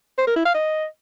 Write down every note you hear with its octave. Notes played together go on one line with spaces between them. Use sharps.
C5
A#4
E4
F5
D#5